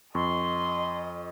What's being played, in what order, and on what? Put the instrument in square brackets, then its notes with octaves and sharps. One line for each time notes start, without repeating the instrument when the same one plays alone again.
[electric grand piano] F2 [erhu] D#5 [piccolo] C6 [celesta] C#6